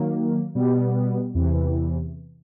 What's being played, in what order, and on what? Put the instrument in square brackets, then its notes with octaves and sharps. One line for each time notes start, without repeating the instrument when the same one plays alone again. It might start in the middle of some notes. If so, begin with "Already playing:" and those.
Already playing: [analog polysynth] D#3 F#3 A#3
B2 G3 B3
E2 C3 E3